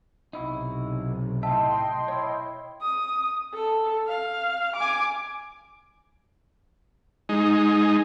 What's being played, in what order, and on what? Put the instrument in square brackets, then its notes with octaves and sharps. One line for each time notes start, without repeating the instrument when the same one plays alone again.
[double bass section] B1 C3 [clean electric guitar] D#4 E4 F#4
[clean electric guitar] A2 E5 [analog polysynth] D#5 G5 C6 [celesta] A5
[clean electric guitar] E4 C#5
[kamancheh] D#6
A4
F5
G#5 D6
[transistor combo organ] G#3 D#4